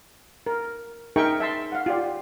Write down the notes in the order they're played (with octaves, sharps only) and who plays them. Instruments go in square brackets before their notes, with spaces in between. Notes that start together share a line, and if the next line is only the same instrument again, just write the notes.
[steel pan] A#4
D#4 G#4 A#4 E5 G5 C#6
E5 A5 C6
F5 F#5
F4 G4 D5